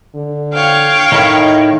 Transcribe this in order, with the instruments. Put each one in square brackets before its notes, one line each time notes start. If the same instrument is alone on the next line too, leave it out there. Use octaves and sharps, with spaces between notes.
[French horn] D3
[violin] C#5 G5 [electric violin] F5
[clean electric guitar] A2 D#3 [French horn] D#4